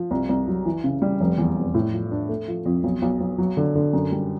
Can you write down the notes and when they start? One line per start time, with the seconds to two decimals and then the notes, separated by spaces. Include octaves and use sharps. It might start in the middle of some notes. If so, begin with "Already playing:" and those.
Already playing: F3
0.11 C2
0.29 C2
0.48 F#3
0.65 E3
0.84 C#3
1.02 G3
1.20 F1
1.38 E2
1.56 F1
1.75 A2
1.93 F3
2.11 D4
2.29 A3
2.48 F3
2.65 F2
2.84 B1
3.02 B1
3.20 B1
3.38 F#3
3.57 D3
3.75 D3
3.93 F#2
4.12 G3